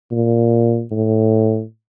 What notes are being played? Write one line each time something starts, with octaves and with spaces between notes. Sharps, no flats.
A#2
A2